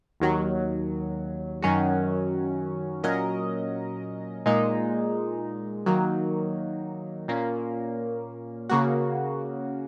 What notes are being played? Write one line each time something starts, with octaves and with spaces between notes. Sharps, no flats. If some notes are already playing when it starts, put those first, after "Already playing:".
D#2 D#3 F#3
F#2 D#3 F#3 C#4 F#4
A#2 F#3 C#4 A#4 D#5
A#2 G#3 D#4
D#3 F#3 A#3 D#4
A#2 A#3 C#4
C#3 A#3 F#4